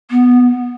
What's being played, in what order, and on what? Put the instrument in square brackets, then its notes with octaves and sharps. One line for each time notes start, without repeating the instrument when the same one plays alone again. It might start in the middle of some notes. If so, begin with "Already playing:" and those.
[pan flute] B3